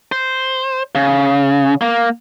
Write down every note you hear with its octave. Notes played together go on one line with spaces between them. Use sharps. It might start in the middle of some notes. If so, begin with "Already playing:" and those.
C5
C#3
A#3